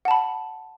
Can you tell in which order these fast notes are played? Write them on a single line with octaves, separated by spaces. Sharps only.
F#5 A5 B5